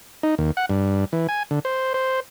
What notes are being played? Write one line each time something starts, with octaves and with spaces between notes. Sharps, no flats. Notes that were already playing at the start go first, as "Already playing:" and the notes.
D#4
D#2
F#5
G2
E3
G#5
D3
C5
C5